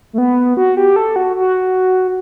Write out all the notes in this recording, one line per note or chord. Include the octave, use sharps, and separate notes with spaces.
A3
B3
F#4
G4
A4
F#4
F#4